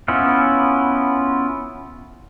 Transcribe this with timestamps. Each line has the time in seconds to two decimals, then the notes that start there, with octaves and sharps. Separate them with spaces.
0.08 B3 C#4 E4 F4